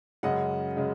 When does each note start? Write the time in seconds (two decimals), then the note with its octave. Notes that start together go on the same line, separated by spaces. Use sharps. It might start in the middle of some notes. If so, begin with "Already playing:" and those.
0.23 F#2 C#3 G#3 C#4 D#5 F#5
0.77 C#3 G#3 C#4